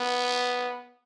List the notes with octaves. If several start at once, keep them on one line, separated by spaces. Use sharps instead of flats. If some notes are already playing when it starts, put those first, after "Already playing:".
Already playing: B3